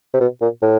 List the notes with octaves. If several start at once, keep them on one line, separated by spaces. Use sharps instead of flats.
C3
B2
A#2
A2